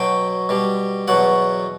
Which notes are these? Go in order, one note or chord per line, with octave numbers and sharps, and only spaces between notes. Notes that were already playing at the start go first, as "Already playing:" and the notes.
Already playing: B2 F#3 G5
B2 G3
E2 B2 F#3 F#5